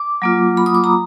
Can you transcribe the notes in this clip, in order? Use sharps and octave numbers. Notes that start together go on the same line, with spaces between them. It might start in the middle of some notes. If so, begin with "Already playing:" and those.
Already playing: D6
F#3 A#3 F4
B5
D#6
D6
A#5